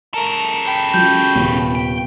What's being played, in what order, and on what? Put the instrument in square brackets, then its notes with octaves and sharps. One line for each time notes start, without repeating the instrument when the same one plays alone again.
[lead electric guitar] C#3 A4 [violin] A#4
[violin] G5 B5
[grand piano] F#3 C#4 F4 [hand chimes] G6
[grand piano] D#1 C3 [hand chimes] B3
[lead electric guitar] G5